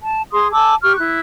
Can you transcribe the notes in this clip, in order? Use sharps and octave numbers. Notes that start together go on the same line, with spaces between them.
A5
G#4 C6 D#6
G#5 A5 D6 E6
G4 C#6 F6
E4 F#6